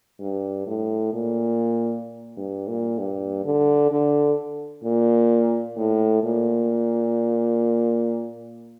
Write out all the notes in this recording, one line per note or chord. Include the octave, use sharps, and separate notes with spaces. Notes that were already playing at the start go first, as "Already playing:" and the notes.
G2
A2
A#2
G2
A#2
G2
D3
D3
A#2
A2
A#2